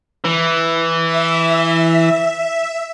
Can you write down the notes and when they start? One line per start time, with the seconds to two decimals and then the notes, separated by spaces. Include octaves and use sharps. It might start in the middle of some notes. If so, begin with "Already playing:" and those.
0.24 E3
1.06 E5